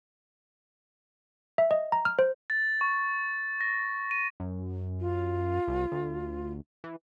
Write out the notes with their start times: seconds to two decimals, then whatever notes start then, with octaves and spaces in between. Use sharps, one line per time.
1.58 E5
1.71 D#5
1.92 A#5
2.05 F6
2.19 C5
2.50 A6
2.81 C#6
3.61 A#6
4.11 D#7
4.40 F#2
5.00 F4
5.68 C2
5.92 D2
6.84 E3